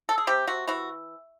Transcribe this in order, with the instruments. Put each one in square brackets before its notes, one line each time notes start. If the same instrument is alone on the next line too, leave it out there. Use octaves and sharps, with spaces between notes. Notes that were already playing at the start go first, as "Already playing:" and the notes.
[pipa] A4
G#4
C3 G4
C3 F#4
E3 F#4